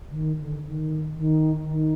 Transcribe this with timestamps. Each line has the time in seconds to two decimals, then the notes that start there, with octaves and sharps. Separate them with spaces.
0.11 D3
0.15 D#3
0.40 D3
0.65 D#3
1.16 D#3
1.66 D#3